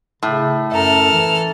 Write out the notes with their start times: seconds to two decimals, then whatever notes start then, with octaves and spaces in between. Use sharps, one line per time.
0.23 A2 C#3
0.72 F#2 A4 E5 A#5 F6
1.12 E3